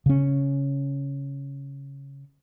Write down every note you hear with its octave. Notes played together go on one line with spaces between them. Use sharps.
C#3 C#4